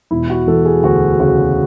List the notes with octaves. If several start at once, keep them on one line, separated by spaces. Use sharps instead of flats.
E1 E4
F#4
E3 A4
G#4
D2 F#4
C#3 F#4